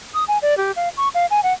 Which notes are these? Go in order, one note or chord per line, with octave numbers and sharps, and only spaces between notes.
D#6
G#5
D5
G4
F5
C#6
F5
G#5
F#5